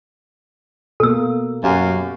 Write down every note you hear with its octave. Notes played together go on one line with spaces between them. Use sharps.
B2 A#3 A4 E6
F#2 F#4 G4 F5